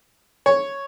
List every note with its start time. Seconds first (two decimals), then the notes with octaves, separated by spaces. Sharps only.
0.46 C#5